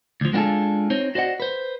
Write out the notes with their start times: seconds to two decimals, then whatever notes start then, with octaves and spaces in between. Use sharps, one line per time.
0.21 D2 F3
0.33 G#3 B3 D4 F4 G#4 A4
0.90 C4 D#4 C5 C#5
1.15 F#4 C5 D5 D#5 F#5
1.40 B4 C5